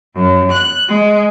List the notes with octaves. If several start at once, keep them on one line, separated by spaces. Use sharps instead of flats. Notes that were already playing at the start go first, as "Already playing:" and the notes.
F#2
F#6
G#3